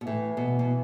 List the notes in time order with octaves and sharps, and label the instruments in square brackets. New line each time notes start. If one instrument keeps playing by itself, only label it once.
[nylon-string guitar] B2
[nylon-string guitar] A2 [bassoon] E3
[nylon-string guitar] B2
B2